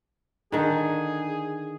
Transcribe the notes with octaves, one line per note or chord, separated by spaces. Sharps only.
D3 D#3 G#4